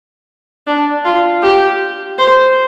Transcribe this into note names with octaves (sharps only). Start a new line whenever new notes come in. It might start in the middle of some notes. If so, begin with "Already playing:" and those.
D4
F4
G4
C5